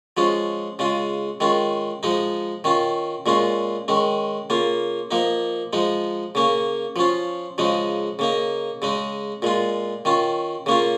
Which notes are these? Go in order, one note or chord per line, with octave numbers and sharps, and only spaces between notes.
F3 G#3 C#4 F4
C#3 G#3 F4
D#3 G#3 C#4 F4
F3 G#3 D#4
D#3 C#4 F4
A#2 G#3 C#4 F4
D#3 G#3 C#4
C#3 A#3 F4
F3 A#3 D#4
F3 G#3 D#4
C#3 A#3 C#4
F3 C#4 F4
C#3 F3 G#3 D#4
C#3 A#3 D#4
C#3 G#3 D#4
A#2 G#3 F4
D#3 C#4 F4
C#3 A#3 C#4 F4